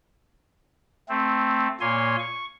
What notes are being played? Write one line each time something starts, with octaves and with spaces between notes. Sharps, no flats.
A3 C4
A#2 A#3 C#5 G#5 C6
C#6